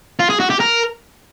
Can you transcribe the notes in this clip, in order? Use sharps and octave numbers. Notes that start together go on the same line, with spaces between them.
F4
G#4
F#4
G4
A#4